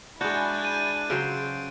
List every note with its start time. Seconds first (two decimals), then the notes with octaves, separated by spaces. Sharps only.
0.21 G#3 D4 E4 F#4 G#5 F#6 G6 A6
0.61 G6 D#7
1.10 C#3 F#3 C5 D7